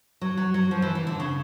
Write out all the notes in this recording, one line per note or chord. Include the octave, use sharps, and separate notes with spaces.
F#3
F#3
F#3
F3
E3
E3
D3
C#3